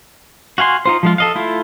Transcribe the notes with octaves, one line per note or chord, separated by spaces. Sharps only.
F#4 F5 G#5 C6
D#4 F4 C5
F3 G#3 F4
A4 D#5 F5
A3 E4 F4